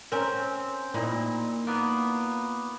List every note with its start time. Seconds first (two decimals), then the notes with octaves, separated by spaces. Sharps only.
0.12 C4 C#4 A#4
0.94 A#2 D#4 E4
1.67 A#3 B3